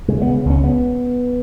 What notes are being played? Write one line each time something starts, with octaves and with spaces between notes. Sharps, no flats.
C#3 G#3
B3
C#3
C#2 C#4
B3